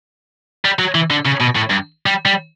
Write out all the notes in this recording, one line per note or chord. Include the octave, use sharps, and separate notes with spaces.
G3
F#3
E3
D3
C#3
B2
A2
G2
G3
G3